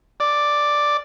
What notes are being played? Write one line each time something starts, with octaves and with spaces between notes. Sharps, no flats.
D5